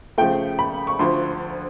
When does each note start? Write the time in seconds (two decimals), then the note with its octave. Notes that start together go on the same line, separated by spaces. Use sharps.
0.18 C#3 F3 A3 G5
0.59 B5
0.87 C#6
0.99 D2 D3 F3 C6